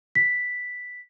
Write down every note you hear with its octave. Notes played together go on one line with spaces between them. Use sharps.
B6